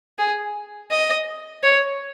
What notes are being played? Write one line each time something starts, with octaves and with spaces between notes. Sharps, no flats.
G#4
D#5
C#5